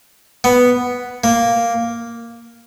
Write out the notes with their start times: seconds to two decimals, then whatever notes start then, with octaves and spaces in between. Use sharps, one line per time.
0.44 B3
1.24 A#3